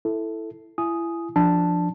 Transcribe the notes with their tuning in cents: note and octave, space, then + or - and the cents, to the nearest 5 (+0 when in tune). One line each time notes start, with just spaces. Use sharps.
E4 +0 A4 +0
E4 +30 G#5 +15 D#6 +0
F3 +0 D4 +0 A5 +0